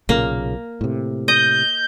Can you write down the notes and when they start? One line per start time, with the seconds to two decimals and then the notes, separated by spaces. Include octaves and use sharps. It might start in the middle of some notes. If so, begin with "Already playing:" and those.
0.09 B1 A#2 C#3 A#3
0.81 A2 C3
1.28 D#5 G6